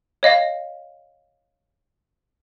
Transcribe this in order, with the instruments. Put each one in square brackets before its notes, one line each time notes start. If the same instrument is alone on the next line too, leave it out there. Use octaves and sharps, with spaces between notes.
[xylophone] C#5 D#5 F5 A#6